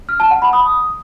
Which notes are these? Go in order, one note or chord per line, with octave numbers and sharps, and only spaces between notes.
F6
A5
F#5
B5
D#6